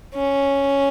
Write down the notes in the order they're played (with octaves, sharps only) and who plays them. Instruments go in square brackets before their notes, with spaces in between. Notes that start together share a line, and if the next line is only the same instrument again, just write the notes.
[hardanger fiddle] C#4